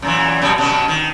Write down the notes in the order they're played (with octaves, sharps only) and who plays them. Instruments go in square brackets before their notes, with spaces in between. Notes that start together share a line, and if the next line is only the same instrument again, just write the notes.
[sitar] F#2 A#2 E3
F#2 B2 G3
B2 D3 C#4
D#3